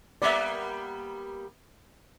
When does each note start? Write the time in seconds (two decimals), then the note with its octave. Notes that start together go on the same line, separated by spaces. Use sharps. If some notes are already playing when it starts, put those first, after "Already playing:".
0.22 G3 A#3 B3 D5 E5